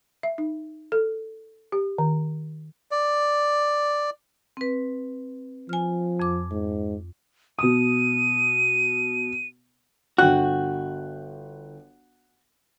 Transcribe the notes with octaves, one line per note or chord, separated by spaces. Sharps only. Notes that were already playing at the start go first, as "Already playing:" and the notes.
E5
D#4
A4
G4
D#3
D5
C4 B4
F3 G#5 F6
F2 D6
G#2
B2 D#6 D#7
G1 F#4 G5 F#6